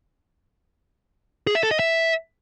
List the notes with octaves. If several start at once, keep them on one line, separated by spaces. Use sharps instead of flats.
G#4
E5
A4
D#5
E5